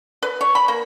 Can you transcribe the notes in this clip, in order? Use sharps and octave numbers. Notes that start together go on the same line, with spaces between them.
B4
C#5
B5
A#3